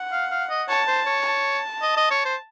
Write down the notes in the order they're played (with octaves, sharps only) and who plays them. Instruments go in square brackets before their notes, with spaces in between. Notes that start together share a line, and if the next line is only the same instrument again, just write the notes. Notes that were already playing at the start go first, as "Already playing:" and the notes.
Already playing: [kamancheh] F#5
[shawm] F5
F5
D#5
[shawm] C#5 [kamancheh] A5
[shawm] C5
C#5
[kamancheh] A5
[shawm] D#5
D#5
C#5
C5